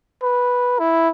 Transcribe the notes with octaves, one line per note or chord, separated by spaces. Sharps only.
B4
E4